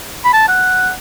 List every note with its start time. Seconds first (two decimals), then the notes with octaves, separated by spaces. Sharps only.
0.25 B5
0.33 A5
0.48 F#5